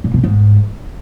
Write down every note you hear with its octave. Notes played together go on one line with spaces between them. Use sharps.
A#2
B2
G#2